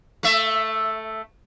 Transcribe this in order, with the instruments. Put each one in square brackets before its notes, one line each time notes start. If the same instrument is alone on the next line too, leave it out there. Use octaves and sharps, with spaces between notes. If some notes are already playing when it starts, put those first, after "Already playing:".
[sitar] A3 E5